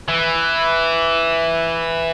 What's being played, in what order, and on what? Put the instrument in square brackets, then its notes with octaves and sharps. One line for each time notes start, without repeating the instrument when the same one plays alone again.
[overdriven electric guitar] E3